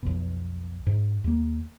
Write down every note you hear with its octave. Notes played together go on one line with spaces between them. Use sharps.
B1 F2 B2
G#2
D#2 A#3